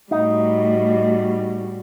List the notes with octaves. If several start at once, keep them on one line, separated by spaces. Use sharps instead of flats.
A2 G3 D#4 F#4